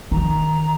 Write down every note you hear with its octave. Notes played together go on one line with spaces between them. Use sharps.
D#3 A#5